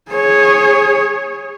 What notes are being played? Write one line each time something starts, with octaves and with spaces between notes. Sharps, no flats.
G#4 C#5